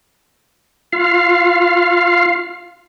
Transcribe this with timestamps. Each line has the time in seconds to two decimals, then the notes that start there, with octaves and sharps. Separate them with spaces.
0.93 F4 F5